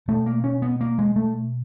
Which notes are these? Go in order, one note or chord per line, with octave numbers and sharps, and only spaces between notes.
B2 A3
A#3
C#4
B3
A#3
G#3
A3